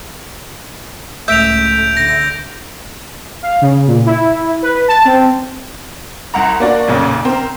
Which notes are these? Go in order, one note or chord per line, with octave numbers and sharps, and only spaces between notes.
C#2 A2 A3 E5 G6 D7 F7
D3 A#6
F5
C#3
A#2
E4
B4
A5
C4
C2 F#5 A#5
A#3 D4 F#4
B1 F2 A#2 C#3
C4 A#4